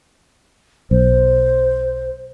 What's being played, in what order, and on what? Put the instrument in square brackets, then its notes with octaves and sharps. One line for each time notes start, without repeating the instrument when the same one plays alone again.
[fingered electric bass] B1 [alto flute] C5